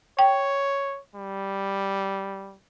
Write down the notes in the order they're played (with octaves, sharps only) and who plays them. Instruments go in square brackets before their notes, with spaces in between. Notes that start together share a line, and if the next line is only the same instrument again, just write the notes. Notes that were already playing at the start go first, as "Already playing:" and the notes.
[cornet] C#5 [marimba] G5
[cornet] G3